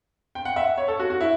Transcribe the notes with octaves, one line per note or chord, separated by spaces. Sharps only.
G5
F#5
E5
C#5
A4
F#4
F#4
E4